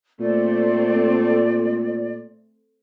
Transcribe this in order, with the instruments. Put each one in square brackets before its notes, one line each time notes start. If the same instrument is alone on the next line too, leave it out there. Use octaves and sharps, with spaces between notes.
[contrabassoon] A#2 [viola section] A3 C4 [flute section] D5